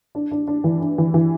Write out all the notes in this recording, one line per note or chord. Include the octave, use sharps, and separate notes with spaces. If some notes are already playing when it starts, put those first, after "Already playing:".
D4
D4
D4
E3
D4
E3
E3